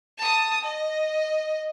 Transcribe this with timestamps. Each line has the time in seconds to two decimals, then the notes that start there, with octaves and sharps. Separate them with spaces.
0.18 A5 D#6
0.64 D#5